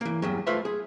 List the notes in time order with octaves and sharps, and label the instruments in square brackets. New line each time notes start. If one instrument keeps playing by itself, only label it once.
[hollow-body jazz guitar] E3 A#3
E2 G2 F#3
A3 F4 B4 C5 E5
G#4